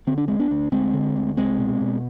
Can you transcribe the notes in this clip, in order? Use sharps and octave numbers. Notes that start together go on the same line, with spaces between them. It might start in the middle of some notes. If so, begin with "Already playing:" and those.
D3 C4
D4
D2 G#3 C4
B3 D4
D2
D2 G#3 C4
D3
D2
C2 G#3 C4
B2
B2